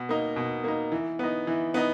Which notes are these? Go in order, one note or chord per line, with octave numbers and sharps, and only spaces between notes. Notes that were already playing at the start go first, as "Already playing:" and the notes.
Already playing: B2
A#3 D#4
B2
A#3 D#4
E3
B3 D#4
E3
B3 D#4